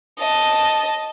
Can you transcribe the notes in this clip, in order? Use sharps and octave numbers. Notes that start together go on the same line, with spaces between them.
D#5 A5